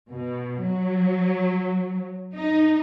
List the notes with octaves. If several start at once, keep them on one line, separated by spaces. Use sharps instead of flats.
B2
F#3
D#4